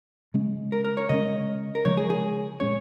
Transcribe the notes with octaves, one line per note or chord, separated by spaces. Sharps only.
C#3 G#3 C#4
A#4
A#4
C#5
C#3 G#3 C#4 D#5
A#4
C#3 F3 G#3 C#5
G#4
G#4
A#2 G#3 C#4 C#5